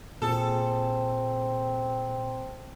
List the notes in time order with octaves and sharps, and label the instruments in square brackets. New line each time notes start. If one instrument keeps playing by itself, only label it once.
[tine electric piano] A#2 G#4 [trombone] C4 [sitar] A4